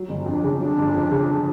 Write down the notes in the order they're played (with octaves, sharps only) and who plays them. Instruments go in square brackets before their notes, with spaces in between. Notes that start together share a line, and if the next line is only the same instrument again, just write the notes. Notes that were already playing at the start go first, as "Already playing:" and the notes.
Already playing: [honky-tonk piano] F#3
G1
[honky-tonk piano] F2 [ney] D4
[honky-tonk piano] C#3
[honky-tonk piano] F#3 [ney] D4
[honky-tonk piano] G1
F2
C#3